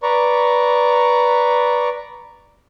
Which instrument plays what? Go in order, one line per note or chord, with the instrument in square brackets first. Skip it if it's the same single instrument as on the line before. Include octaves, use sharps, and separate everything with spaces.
[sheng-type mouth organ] B4 D5 A#5 C#6